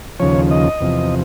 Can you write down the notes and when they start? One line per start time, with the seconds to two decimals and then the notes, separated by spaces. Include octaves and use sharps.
0.20 D#2 C#3 F3 C#5
0.51 D#5
0.81 E2 C3 F3